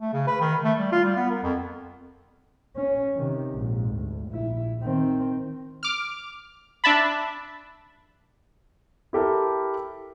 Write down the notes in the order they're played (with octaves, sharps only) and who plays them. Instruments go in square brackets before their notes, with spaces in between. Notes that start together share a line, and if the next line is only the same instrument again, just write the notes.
[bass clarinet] A3
C#3
B4
D#3
A3
G3
F4
G3
B3
A#4
F2
[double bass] C#4
C3 D#3
A#1 G#2
D2
A#1 E4
D#3 C4
[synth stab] D6 F6
D4 E5 A5 B5
[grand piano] E4 G4 A4 A#4